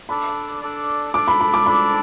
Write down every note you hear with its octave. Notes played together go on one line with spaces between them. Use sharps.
D4 A4 D5 B5
D4 A4 D5
D4 A4 D5 D6
B5
B5
D6
D4 A4 D5 B5